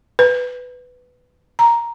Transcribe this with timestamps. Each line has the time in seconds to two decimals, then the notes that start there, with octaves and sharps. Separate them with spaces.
0.19 B4
1.59 A#5